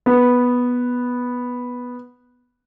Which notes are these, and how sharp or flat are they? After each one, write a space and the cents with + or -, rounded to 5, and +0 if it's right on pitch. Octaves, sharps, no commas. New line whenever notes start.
B3 -5